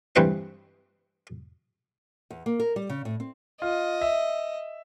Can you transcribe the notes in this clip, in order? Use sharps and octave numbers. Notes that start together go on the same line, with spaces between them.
G2 E3 C4 B4 C5 C#6
E2
A#3
A#4
G3
C#3
A2
C4
F4 D#5
E5